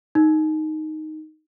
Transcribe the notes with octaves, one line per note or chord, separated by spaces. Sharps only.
D#4